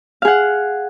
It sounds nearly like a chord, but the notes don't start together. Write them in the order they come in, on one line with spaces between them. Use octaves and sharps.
F5 G#4 F#5